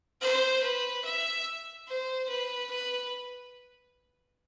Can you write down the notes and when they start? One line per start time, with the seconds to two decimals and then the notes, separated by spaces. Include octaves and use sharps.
0.21 C5
0.63 B4
1.05 E5
1.88 C5
2.30 B4
2.71 B4